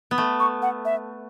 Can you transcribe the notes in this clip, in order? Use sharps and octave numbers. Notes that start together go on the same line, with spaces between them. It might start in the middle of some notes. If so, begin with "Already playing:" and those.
B3
A3
C#6
F#5
E5